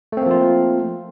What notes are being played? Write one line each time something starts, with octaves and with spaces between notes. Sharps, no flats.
F3 A3 A#3 C4 F4